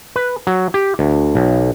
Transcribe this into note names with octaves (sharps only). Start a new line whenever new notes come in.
B4
F#3
G4
D2
B1